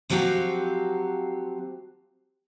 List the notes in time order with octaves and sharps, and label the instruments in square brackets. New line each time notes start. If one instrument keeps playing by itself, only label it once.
[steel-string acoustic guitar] F3 F#3 C4 F#4 G4 F5